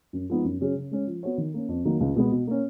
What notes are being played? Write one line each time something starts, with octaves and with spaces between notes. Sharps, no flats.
F#2
F3 G#3 B3 D#4
F#2
C#3 F#3 C#4 G#4
C#3
G#3 C#4
F3
B3 F#4 C#5
D#3
A#3 C#4
F2
D#3 F#3 A#3 D#4
C#2
B2 G#3 B3
B2
A#3 C#4